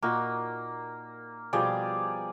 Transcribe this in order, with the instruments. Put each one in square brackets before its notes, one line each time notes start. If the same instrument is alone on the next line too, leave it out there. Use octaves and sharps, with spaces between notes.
[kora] A#2 D#4 F#4 [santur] A#3
[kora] B2 F3 G3 [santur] G4 G#4 D5